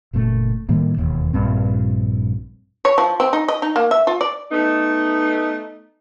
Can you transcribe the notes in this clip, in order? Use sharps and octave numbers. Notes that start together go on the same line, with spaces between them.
F#1 F#2 A#2 A3
A2 D#3 G3 A#3
E1 D#2
A#1 G2 C4
C#5
F3
C4
D#4
D#5
D#4
A#3
E5
F4
D5
A3 B3 D#4